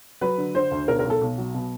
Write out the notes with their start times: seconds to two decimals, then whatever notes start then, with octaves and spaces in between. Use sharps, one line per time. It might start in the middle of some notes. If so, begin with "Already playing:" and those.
0.21 F#3 B4
0.38 D3
0.55 D3 C5
0.71 D2
0.88 B1 A#4
0.99 A#4
1.05 B1
1.10 A4
1.21 B1
1.38 F#3
1.54 B2